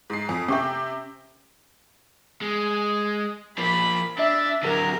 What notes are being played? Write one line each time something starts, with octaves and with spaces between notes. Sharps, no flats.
G#2 C7
F2 G#5
C3 C#4 G4 E5 G5
G#3
F3 A#3 B5
D4 E5
D3 F#3 A#4